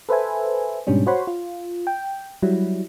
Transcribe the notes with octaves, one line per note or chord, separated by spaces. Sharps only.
A4 B4 C5 E5 G#5
G#2 B2 G3 C#4 D4
F#4 C5 C#5 F#5 B5 C6
F4
G5
F#3 G3 E4